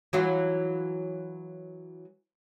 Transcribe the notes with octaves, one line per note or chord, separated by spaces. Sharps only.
E3 F#3 F4